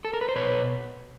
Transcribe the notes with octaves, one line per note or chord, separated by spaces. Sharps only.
A4
A#4
B4
C5
B2 B4 C#5